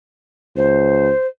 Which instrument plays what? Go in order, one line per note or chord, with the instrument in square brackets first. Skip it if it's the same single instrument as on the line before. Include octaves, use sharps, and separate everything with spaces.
[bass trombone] C#2 [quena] C5